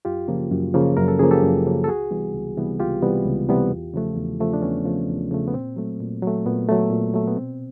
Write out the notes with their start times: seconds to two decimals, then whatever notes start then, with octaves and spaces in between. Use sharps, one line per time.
0.05 F#2 F4 G4
0.28 C#3 F3 A#3
0.51 F#2
0.74 C#3 F3 A#3
0.97 F#2 A#4
1.08 A4
1.19 C#3 F3 A#3 G#4
1.31 G4 A4
1.43 F#2
1.66 C#3 F3 A#3
1.84 A4
1.88 C#2 F#4 G#4
2.11 C3 E3 G3 B3
2.34 C#2
2.57 C3 E3 G3 B3
2.80 C#2 F4 G4
3.02 C3 E3 G3 B3
3.25 C#2
3.49 C3 E3 G3 B3
3.71 E2
3.94 C#3 F3 A3
4.17 E2
4.40 C#3 F3 A3
4.53 D4
4.62 E2 B3 C#4
4.85 C#3 F3 A3
5.08 E2
5.31 C#3 F3 A3
5.48 B3
5.54 A#2 C4
5.76 F#3 A3
6.00 A#2
6.22 F#3 A3
6.45 A#2 B3
6.69 F#3 A3
6.91 A#2
7.14 F#3 A3
7.28 B3
7.37 B2 C4